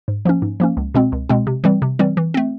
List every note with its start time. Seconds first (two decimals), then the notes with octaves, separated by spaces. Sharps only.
0.08 G#2
0.25 F3 A#3 C#4
0.42 G#2
0.60 F3 A#3 C#4
0.77 C#2
0.94 B2 G#3 C4
1.12 C#2
1.29 B2 G#3 C4
1.47 C3
1.64 E3 G3 C4
1.82 C3
1.99 E3 G3 C4
2.17 E3
2.34 A3 C4